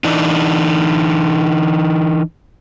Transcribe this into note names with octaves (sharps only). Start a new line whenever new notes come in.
E3 D4 D#4